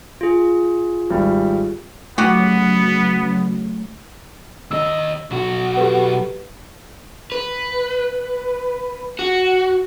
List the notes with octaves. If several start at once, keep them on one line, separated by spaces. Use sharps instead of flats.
F4 G#4
G#1 G3
C#3 F#3 A3 B3 F#4 G4 F#5
D#2 D#5 E6
B1 F#4
G4 A4 B4
B4
F#4